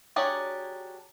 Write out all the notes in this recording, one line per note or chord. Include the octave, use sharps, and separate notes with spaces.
F#3 D4 G4 G#4 C#5